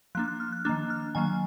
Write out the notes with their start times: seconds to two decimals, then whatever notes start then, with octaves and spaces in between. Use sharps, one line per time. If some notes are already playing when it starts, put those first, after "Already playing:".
0.15 F3 A#3 D4 F#6
0.28 F#6
0.40 F6
0.52 F#6
0.65 D#3 A#3 D4 F#6
0.90 F6
1.15 D#3 F#3 A#3 G#5